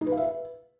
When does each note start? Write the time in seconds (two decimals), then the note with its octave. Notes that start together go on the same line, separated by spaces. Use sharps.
0.01 D#4
0.07 B4
0.12 F5
0.17 E5
0.23 B4